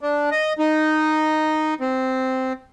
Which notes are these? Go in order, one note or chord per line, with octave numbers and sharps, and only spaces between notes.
D4
D#5
D#4
C4